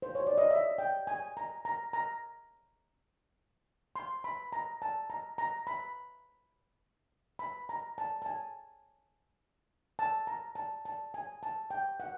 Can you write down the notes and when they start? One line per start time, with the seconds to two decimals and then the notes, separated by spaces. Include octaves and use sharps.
0.02 C5
0.15 C#5
0.27 D5
0.38 D#5
0.51 E5
0.78 G5
1.07 G#5
1.37 A#5
1.65 A#5
1.93 A#5
3.96 C6
4.24 B5
4.52 A#5
4.82 A5
5.10 A#5
5.38 A#5
5.67 B5
7.39 B5
7.69 A#5
7.98 A5
8.22 A5
8.26 G#5
9.99 A5
10.27 A#5
10.55 A5
10.85 A5
11.14 G#5
11.43 A5
11.71 G5
12.00 F#5